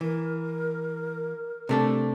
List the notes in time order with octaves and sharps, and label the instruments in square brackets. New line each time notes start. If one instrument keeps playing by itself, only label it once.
[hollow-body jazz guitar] E3 [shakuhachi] A#4
[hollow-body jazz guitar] C3 A3 D4